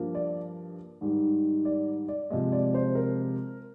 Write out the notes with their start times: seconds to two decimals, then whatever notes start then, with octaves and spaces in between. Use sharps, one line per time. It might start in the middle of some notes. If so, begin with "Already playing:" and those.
Already playing: G2 F3 A#3
0.15 D5
1.01 G#2 D#3 G3
1.65 D5
2.08 D5
2.30 C3 F3 G#3 D#5
2.52 D5
2.74 C5
2.95 A#4